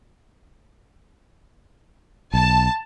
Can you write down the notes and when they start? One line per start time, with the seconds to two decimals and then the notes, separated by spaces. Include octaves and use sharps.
2.34 B1 A5